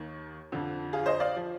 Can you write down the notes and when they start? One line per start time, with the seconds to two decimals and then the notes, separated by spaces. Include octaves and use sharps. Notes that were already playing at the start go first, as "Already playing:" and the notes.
Already playing: D#2 D#3
0.52 F2 D3 F3
0.93 F4 G#4
1.06 C5 D#5
1.20 D5 F5
1.36 F3